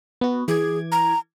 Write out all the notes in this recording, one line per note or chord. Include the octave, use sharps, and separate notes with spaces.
B3 F#4
E3 G#4 D6 G#6
A#5